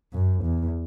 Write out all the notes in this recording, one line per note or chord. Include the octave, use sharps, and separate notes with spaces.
F#2
E2